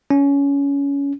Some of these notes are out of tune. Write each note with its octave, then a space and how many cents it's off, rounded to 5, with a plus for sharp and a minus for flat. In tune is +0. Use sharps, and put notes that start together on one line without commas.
C#4 +20